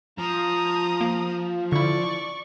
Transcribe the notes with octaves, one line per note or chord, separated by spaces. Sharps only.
F3 A#5 D#6
A#3
D3 E4 D5 C#6